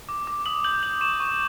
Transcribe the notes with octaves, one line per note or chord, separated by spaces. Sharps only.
D6
D6
D#6 F#7
G6 F#7
G6 F#7
C#6 E7
C#6